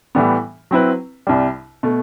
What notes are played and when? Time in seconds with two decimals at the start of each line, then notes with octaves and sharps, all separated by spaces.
0.15 A2 E3 G3 B3
0.71 F#3 C4 E4 B4
1.27 C2 C3 G3
1.83 B2 A3